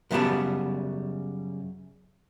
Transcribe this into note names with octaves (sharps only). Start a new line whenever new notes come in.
F#2 C#3 G3 B3 A5 B5